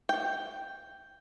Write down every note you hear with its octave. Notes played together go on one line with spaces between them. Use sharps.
G5